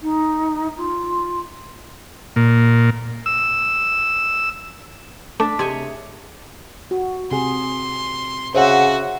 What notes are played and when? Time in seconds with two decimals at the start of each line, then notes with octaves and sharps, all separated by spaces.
0.01 D#4
0.77 F4
2.36 A#2
3.26 E6
5.40 A3 D4 D6 E6 B6
5.59 C3 G#4 C#5 D#5 E5 G#5
6.91 F#4
7.31 C3 G#4 C6
8.55 C#3 F#4 C5 E5 F#5